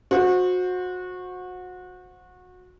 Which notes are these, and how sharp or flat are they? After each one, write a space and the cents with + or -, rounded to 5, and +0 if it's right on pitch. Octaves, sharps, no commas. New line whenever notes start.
F#4 -25 C5 +0